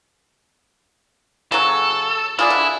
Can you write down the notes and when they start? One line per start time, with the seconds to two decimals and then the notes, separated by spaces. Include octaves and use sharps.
1.52 C#3 F#3 A4
2.39 E4 F4 G#4 D5
2.50 D3